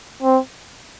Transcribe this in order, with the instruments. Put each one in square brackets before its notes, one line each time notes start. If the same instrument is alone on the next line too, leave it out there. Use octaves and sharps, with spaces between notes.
[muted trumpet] C4